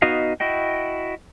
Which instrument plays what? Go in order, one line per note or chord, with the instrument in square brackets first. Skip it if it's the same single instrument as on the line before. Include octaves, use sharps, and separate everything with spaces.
[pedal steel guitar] B3 D#4 F#4 D#5 F5
E4 F#4 D#5 G5